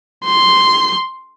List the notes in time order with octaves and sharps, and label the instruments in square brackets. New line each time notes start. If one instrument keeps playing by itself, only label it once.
[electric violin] C6